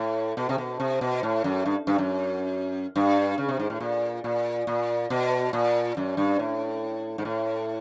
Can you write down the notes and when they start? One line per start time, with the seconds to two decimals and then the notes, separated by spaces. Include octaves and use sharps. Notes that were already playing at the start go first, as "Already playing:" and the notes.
Already playing: A2
0.37 B2
0.49 C3
0.58 B2
0.80 C3
1.01 B2
1.23 A2
1.44 F#2
1.65 G2
1.87 G2
1.98 F#2
2.96 G2
3.38 C#3
3.49 C3
3.59 G#2
3.70 A2
3.80 A#2
4.24 A#2
4.67 A#2
5.10 B2
5.53 A#2
5.97 F#2
6.17 G2
6.39 A2
7.18 G#2
7.25 A2